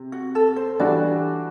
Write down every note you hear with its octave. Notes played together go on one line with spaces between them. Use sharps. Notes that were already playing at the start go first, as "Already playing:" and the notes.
Already playing: C3
F#4
A4
C5
E3 G3 D4 F#4 A4 D5